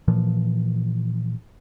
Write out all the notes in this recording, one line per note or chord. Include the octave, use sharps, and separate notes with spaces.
A#2 E3 F3